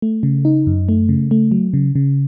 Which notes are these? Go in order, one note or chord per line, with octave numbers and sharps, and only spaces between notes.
A3
C#3
D#4
F#2
A3
C#3
A3
F#3
C#3
C#3